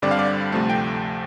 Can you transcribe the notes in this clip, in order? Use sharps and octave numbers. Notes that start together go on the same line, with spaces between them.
G2 D3 G3 C4 D5
F5
D5
D2 C3 F3 A3
G5